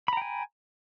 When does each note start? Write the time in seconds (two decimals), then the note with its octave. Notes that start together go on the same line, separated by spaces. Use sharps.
0.08 B5
0.13 A#5
0.17 G5
0.22 G#5